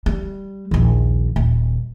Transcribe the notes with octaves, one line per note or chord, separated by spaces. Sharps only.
G3
A#1 D#2
D#1